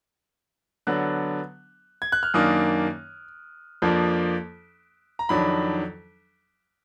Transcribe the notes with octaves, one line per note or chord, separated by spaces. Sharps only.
D3 F#3 B3 D4 F#6
G#6
F#6
F6
F#2 D#3 A#3 D4 D#6
F2 F3 A#3 D4
A#5
F2 D#3 F#3 D4 B5